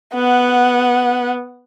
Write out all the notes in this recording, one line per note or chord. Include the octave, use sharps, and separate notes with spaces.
B3 F#5